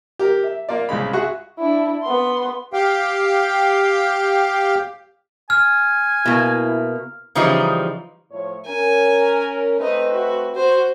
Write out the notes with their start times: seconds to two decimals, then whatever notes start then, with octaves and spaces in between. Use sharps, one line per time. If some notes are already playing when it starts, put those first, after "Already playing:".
0.19 G4 A#4
0.43 E5
0.69 A#3 F4 D5
0.89 C2 C#3 G#3 B5
1.13 F#4 G#4 E5 C#6 F#6
1.59 D4 E4
2.03 B3 C6
2.73 G4 F5 G5
5.50 G#5 F6
6.26 B2 A#3 E4
7.35 C#3 E3 F3 G3 D#4
8.32 A2 F3 C#5
8.67 C#4 A#4 G#5
9.79 A3 C4 D#4 B4 D#5
10.14 F#4
10.55 F#4 C5